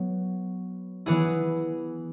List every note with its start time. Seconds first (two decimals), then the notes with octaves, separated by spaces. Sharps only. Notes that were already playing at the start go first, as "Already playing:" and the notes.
Already playing: F#3 B3
1.06 E3 B3 E4 G#4